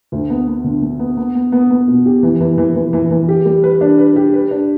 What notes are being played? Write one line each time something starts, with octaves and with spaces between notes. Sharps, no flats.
D2
B3
B3
D3
D3
B3
B3
B3
B3
B3
B2
G4
E3
E3
E3
E3
E3
E3
G4
G3
B4
D4
B4
G4
B4
D4